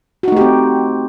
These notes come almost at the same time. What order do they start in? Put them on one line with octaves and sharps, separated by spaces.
F#4 D#4 A3 G4 C4